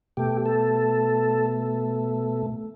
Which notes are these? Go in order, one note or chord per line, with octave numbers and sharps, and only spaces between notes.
B2 A3 G4
A4